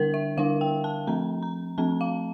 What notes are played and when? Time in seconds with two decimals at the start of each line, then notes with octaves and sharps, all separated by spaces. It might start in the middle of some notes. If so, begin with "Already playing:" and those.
Already playing: D3 G3 D4 A#4
0.14 E5
0.37 D3 G3 D4 F5
0.61 G5
0.84 A5
1.07 F3 A3 C4 A#5
1.43 A#5
1.78 F3 A3 C4 A5
2.01 F5